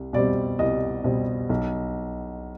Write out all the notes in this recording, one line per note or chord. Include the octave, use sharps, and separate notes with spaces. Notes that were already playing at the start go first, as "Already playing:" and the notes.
Already playing: C2
B2 G3 C4 D5
C2 D#5
B2 G3 C4
B1